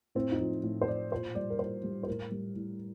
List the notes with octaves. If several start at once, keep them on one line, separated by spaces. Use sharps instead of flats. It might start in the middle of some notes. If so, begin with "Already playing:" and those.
A2 C4
D#4
F3
A2
C5
F3 D5
A#2 C5
G3 D5
A#4
A#2 C5
G3
C5
A2 A#4
G3
A2